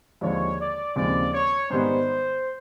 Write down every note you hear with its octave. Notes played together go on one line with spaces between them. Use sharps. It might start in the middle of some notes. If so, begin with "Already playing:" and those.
D#2 D3 F3 G#3 C#5
D5
D#2 C#3 F3 G#3 C4 D5
C#5
G#2 D#3 G3 B3 C5